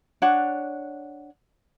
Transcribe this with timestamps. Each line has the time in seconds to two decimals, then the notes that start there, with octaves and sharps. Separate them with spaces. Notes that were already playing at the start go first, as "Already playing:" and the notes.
0.22 D4 C#5 F#5